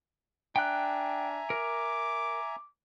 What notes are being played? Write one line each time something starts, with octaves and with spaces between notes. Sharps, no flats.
D4 E5 G5 G#5 A#5 F#6
A#4 D6